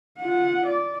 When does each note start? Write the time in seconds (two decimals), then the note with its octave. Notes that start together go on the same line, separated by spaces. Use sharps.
0.19 F4 F#5
0.66 D5